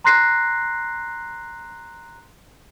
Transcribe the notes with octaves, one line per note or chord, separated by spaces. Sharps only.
A#5 C6 F#6 A#6 C7